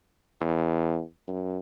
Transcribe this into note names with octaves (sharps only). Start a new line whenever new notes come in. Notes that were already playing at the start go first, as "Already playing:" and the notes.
E2
F#2